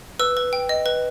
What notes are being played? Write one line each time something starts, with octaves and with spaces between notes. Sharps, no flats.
B4 E6
B4
G5
D#5
B4